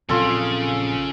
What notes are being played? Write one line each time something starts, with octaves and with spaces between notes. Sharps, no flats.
A#1 C#3 F#3 C4 F4 A4